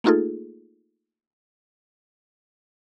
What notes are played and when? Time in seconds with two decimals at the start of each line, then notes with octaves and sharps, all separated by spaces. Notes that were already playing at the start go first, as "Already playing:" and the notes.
0.04 A3 A#3 D#4 F4 G#4 A4